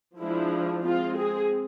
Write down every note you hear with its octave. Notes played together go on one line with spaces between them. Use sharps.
F3 G#3 D4 E4
G#3 C4 F4
G#4